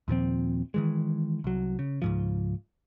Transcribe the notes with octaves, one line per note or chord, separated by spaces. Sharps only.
D#2 A#2 F3 C4
D#3 E3 G#3
C2 F#3
C#3
C#2 G#2 F3